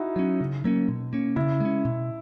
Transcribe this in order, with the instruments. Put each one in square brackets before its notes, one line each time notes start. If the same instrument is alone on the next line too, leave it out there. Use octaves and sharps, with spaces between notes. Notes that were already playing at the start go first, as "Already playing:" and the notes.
Already playing: [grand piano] D#4 E4 F#4
[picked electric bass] F#3 C#4
C#3
F#3 A#3 C#4
B2
A#3 C#4
[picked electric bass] C#3 [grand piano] E4
[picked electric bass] G#3 C#4
B2